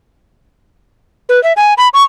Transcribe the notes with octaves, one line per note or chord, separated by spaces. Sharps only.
B4
E5
G#5
B5
C#6